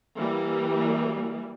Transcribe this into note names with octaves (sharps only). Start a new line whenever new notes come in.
E3 G3 A#3